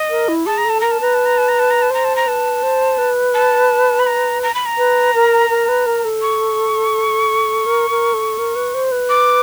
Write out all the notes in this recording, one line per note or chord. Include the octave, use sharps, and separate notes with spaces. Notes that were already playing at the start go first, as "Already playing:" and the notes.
Already playing: D#5
A#4
E4
G#4 A5
A#5
A4 A5
A#4 A#5
A5
B4 A#5
A5
A#5
A5
A#5
A5
A#5
A5
C5 A#5
A5
A#5
B4 A5
C5
B4
A5
B5
A#5
A#5
B5
A#5
B4
A#4
A#4
B4
A#4
A4
C#6
A#4
A#4
A4
A#4
B4
C5
B4
D6